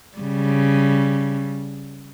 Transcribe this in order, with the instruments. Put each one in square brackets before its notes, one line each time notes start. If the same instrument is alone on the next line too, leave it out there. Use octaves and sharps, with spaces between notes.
[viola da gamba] C#3 G3